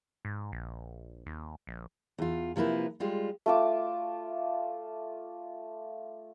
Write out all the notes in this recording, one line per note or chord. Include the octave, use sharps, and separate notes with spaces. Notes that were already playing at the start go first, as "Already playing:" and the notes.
G#2
A#1
D#2
A#1
E2 F4
C3 F3 A#3 E4 B4
G3 G#3 F4
A3 F4 D6